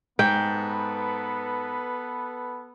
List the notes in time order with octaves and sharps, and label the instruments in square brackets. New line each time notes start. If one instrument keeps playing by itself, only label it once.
[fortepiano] G#2 [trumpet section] B3 A4 B4 [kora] G5